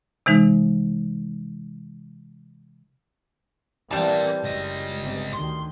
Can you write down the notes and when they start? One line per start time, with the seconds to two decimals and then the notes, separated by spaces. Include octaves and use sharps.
0.26 C3 E3 G#3 D#4
3.91 E3 G3 C4 A#4 D5 A5
4.44 F#1 C#2 D#5
5.00 G1 C3
5.33 D2 D#3 C6